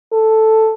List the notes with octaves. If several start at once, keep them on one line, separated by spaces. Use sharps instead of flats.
A4